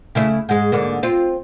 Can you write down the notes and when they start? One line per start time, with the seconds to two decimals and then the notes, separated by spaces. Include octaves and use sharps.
0.15 C#3 A3 E4
0.49 G#2 G#3
0.72 G#2 D3 A#3
1.03 C4 F4